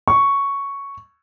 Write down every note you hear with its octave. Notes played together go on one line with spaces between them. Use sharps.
C#6